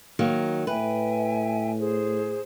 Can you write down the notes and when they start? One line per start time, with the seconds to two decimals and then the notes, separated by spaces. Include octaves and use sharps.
0.19 D#3 F#3 A#3
0.67 A2 B4 E5 G5 G#5
1.79 G#4 C5